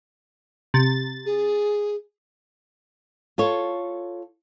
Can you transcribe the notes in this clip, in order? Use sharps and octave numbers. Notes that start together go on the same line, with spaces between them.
C3 A6
G#4
F4 A4 C#5